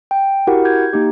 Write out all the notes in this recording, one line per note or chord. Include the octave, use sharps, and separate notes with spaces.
G5
E4 F#4 G4 A#4 F#5
G6 G#6
A#3 D#4 G4